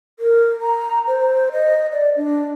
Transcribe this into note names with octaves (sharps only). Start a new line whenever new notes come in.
A#4
A#5
C5
D#5
D5
D4